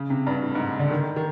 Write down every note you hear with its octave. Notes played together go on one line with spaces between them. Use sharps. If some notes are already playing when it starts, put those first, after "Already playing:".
Already playing: C#3
C3
G2
A2
G#2
D3
D#3
D#3